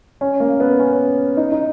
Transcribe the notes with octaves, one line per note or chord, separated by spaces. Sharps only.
C#4
A#3
B3
C#4
D#4
D#4